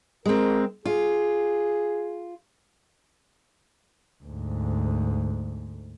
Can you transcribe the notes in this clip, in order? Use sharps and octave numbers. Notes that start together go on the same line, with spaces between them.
G#3 C4 A#4
F4 G#4
D2 G#2